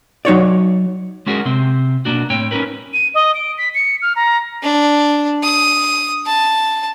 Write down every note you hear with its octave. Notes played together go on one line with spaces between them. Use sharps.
F#3 D#4 C#5 D5
G#3 C#4 F#4 G#4 A#4
C3 C4
B2 A#3 D4 F#4
A2 C4 C#5 G5
C#4 D#4 G4 A#4 B4
D#7
D#5
D7
B6
C#7
F6
A#5
D4
D#6
A5